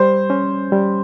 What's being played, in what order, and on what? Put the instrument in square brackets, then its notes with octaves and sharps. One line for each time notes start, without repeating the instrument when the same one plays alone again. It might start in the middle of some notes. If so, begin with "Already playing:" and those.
Already playing: [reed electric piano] G3 [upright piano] C5
[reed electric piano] C#4
G3